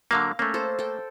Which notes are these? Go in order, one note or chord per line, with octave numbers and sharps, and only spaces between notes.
D3 F#3 A#3 F5 D6
A3 A#3 C#4
A4 C5
A4 G5